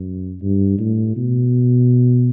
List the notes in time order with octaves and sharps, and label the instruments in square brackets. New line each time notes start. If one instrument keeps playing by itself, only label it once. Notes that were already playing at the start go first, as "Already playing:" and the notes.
Already playing: [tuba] F#2
G2
A2
B2